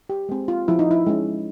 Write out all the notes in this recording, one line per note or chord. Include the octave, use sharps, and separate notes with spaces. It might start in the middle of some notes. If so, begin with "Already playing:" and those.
G4
G#3 C4
F4
F3 E4
D#4
E4
G#3 C#4